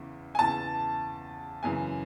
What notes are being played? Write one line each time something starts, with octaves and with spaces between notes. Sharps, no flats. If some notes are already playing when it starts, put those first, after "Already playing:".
Already playing: E2 C#3 E3
G#5
E2 C#3 E3 A5
F#2 C#3 E3 G#5